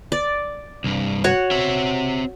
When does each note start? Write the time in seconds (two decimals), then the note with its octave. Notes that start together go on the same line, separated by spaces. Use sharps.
0.12 D5
0.84 C2 G2
1.24 F#4 C#5 F#5
1.51 C4 E5